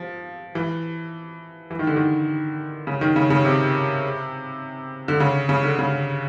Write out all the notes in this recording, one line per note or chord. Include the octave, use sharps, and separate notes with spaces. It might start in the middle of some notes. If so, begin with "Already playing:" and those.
Already playing: F3
E3
E3
D#3
D3
D#3
C#3
D#3
C#3
C#3
C3
D3
C#3
C#3
D3
C#3